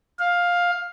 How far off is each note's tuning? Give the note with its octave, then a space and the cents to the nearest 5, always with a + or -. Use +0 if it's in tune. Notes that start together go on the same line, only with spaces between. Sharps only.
F5 +10